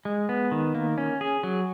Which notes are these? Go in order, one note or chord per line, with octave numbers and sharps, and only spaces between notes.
G#3
B3
D#3
A#3
C#4
G#4
F#3